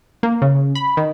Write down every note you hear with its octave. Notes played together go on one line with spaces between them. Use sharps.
A#3
C#3
B5
D#3